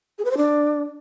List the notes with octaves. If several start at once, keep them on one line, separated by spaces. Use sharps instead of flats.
G#4
B4
C5
D4